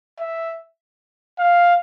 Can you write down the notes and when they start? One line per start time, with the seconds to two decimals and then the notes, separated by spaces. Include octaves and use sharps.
0.19 E5
1.39 F5